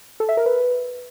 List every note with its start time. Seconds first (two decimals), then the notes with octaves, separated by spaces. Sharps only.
0.20 A4
0.29 E5
0.37 A#4
0.46 B4